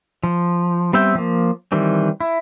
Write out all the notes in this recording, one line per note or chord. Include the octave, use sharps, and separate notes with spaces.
F3
G3 B3 C4 E5 G5
F3 A#3
D#3 E3 G3 C4
E4